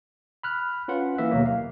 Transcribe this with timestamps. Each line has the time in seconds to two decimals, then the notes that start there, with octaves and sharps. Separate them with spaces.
0.43 B5 F6 F#6
0.88 C#4 F4 B4 F#5
1.18 E3 A#3 B4 E5
1.31 D#2 B2 F#3 A#3
1.46 F5